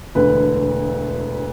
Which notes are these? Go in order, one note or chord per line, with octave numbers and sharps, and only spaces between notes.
E1 D2 D3 B4